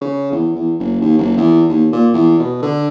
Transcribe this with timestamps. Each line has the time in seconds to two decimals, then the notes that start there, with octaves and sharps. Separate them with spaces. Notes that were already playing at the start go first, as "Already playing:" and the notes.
0.01 C#3
0.32 E2
0.55 E2
0.79 F#1
1.01 D#2
1.19 F#1
1.37 E2
1.69 D#2
1.92 A#2
2.14 E2
2.39 B2
2.62 D3